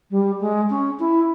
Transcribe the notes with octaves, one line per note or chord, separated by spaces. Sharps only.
G3
G#3
C#4
E4